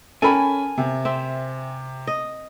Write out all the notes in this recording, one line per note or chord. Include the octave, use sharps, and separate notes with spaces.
C#4 A4 A#4 G5 G#5 B5
C3
C4 E5
D#5